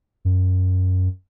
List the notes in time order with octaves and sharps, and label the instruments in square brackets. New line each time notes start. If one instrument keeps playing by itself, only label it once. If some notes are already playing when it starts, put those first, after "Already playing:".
[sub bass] F#2